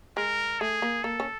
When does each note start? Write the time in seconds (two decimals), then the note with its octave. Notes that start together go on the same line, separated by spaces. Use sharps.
0.17 G#3 A#4
0.60 A3 G#4
0.82 A#3
1.04 A#3 A4
1.20 C#4